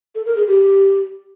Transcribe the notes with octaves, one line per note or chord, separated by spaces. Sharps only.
A4
A#4
G#4
G4